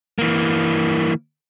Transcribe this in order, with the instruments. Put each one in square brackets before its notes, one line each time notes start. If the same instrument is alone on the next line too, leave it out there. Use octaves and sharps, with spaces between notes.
[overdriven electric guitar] E3 A#3